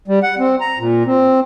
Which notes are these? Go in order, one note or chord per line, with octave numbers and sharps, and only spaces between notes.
G3
F#5
C4
A#5
A#2
C4